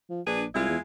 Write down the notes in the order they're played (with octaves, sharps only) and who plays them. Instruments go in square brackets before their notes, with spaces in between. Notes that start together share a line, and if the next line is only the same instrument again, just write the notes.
[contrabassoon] F3
[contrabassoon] A#1 [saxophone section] D4 G#4 B4
[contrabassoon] C2 [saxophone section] G#3 E4 F4
[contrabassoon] E2